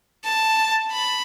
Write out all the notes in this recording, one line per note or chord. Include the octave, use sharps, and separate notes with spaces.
A5
B5